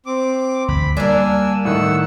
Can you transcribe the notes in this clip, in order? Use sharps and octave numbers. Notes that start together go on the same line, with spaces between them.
C4 D6
D2 B5
G3 A#3 D4 A#4 G#5 E6
A2 D#3 F#5 E6